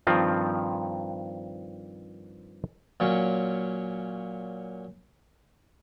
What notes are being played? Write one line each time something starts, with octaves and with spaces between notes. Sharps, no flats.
G2 D#3 F3 C4 F4
A#2 F#3 C#4